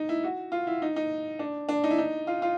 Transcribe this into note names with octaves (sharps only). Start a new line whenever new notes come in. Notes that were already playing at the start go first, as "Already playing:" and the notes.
Already playing: D#4
E4
F#4
F4
E4
D#4
D#4
D4
D4
D#4
E4
D#4
F4
F4